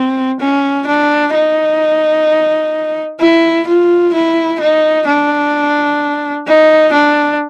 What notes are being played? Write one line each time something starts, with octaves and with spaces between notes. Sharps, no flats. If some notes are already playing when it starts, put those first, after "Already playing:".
Already playing: C4
C#4
D4
D#4
E4
F4
E4
D#4
D4
D#4
D4